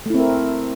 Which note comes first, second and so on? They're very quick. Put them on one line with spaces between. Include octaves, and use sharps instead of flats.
A3 E4 C4 A#4